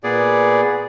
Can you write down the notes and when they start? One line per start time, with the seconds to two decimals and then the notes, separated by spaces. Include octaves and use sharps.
0.04 A#2 B3 G#4 D5